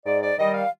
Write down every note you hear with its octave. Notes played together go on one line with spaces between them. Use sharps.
G#2 D5
D5
D#3 G3 D#5
F5